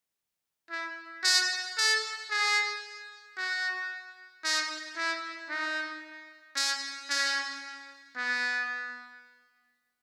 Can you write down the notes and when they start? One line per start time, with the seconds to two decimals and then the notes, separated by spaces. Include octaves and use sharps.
0.71 E4
1.23 F#4
1.78 A4
2.31 G#4
3.37 F#4
4.44 D#4
4.97 E4
5.49 D#4
6.56 C#4
7.10 C#4
8.16 B3